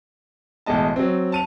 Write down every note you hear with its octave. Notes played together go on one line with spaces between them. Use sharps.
A1 B2 G#3 D#5 A5
F#3 C4
A5 D#7 F7